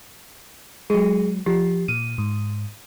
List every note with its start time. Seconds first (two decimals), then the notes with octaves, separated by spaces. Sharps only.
0.90 F#3 G#3 G#4
1.46 F3 G4
1.88 A#2 D#7
2.18 G#2